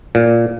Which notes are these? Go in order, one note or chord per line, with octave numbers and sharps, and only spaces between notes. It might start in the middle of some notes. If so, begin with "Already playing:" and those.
A#2